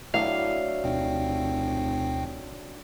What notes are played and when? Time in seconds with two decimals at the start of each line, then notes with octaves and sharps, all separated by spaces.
0.14 A2 F#3 D4 E5 F5
0.83 F1 D2 B2 G5